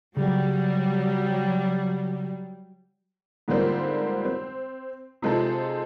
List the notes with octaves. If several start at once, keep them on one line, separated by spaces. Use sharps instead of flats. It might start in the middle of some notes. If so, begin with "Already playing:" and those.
C#3 F#3 G3
G#2 D3 F3 G3 A#3 C4
C4
C3 F3 G#3 C4 D#4 A4